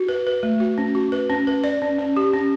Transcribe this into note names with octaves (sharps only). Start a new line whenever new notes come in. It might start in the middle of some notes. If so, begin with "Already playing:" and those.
Already playing: F#4
B4
B4
A3
F#4
C#4
F#4
B4
C#4
B4
D5
C#4
C#4
G4
C#4